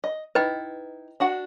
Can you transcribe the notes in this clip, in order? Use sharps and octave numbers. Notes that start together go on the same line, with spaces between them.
D#5
D#4 E4 B4 D#5 G5
D4 F#4 F#5